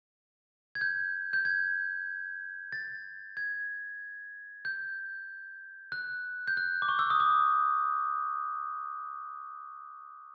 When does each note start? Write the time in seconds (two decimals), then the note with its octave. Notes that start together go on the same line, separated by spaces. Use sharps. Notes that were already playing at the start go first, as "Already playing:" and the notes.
0.75 G#6
0.81 G6
1.33 G6
1.45 G#6
2.72 A6
3.37 G#6
4.65 G6
5.92 F#6
6.48 G6
6.57 F#6
6.82 D6
6.89 C#6
6.99 E6
7.10 D#6
7.20 D6